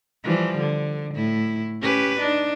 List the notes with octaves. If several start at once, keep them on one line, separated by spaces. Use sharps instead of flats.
E3 F3 G3
D3
A2 E4
C#4 G4 B4
D4 D#4